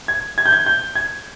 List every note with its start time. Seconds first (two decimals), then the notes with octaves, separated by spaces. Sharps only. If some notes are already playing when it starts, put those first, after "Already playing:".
0.08 G#6
0.38 G#6
0.46 G6
0.53 G#6
0.67 G6
0.95 G#6